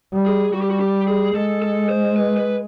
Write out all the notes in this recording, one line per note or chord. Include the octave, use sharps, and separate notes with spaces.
G3
G#4
G3 F#4
G4
F#4
G4
G#4
G#3 A4
A4
C5
B4
B4